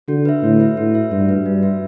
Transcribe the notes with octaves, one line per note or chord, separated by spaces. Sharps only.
D3 F#4
B4 E5
A2 F#4
B4 E5
A2 F#4
B4 E5
G2 F#4
B4 E5
G2 D4
F#4 B4 E5